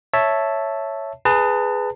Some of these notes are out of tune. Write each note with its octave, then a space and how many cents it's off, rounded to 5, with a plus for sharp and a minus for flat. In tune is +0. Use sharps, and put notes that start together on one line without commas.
C#5 +0 E5 +0 A5 +0
G#4 +0 B4 +5 A5 +35